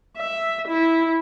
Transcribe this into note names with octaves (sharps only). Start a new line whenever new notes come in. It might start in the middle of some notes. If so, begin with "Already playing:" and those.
E5
E4